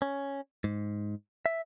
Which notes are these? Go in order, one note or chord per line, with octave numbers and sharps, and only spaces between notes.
C#4
G#2
E5